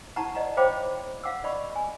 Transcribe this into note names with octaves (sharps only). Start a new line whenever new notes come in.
D#4 E4 F#5 A5 A#5 C#6
D5 D#5 F#5 A#5
C5 C#5 F5 G5 B5 D6
F5 F#5 D6 E6
D5 D#5 B5 C#6
G#5